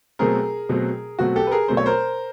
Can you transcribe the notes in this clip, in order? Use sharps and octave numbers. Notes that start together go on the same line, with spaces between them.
B2 F#3 A3 C4 G#4 A#4
B2 F#3 A3 C4
B2 F#3 A3 C4 F#4
G4 A4
B4
G#4 A#4
B2 F#3 A3 C4 C5
C#5
A#4 C5